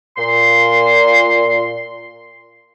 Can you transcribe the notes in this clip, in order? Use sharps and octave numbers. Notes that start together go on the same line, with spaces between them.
A#2 C6